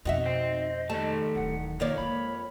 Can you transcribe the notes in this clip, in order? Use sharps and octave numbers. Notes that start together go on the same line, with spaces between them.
F2 B2 D#4 F#4 D#5 E5
C5 G5
D#3 G3 A3 A5
D1 E3 F#5
F2 D#3 A#3 C#5 D5
G#3 F4 B5